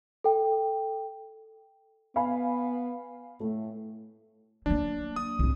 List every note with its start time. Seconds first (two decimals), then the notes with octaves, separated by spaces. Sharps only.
0.24 A4 G5
2.16 B3 F5 G#5 B5
3.40 A2 A3
4.66 F#3 A#3 D4
5.16 D#6
5.39 C2 G#2